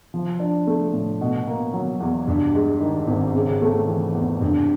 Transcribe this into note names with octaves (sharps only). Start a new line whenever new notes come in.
F3
D4
A3
A2
B2
A#3
F#3
E2
G2
G#3
D#3
G#1
C#3
A3
E3
E2
G2